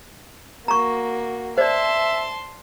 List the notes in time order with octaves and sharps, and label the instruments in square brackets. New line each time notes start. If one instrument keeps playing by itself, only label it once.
[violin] A#3 F#4 [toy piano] A#5 C#6
[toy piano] C5 D5 [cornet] E5 [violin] A5 C6